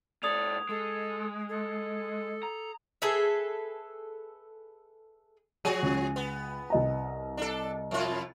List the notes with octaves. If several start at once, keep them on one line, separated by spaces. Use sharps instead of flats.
G#2 A4 D5 D#6 G#6 F7
G#3 A4
A4
A#5
G#4 A4 B4 E5
F3 F#4 G#4 D#7
C#2
B3
C2 D#5 A#5
D4 A4
F2 F4